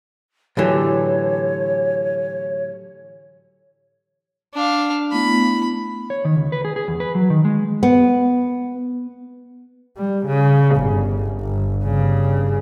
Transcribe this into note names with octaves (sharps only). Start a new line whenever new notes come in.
A2 D3 E3 F#3 G4 A4 C#5
D4 F5
A3 B3 E4 B5
C#5
D#3
C#2
B4
G#4
G#4
E2
B4
F#3
D#3
G#3
B3
G3
C#3
G1
G1
G2 C#3